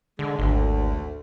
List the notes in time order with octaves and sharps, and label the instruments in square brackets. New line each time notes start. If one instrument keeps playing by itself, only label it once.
[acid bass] D3 [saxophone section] G#3
[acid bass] G#1 [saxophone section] D2